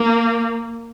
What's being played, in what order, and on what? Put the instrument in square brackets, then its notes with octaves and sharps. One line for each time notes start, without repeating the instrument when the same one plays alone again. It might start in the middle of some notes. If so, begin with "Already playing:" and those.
Already playing: [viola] A#3